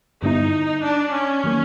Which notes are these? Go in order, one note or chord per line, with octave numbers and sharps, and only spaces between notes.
G2 D3 G3 B3 D#4 E4
D4
C#4
D#3 F#3 A#3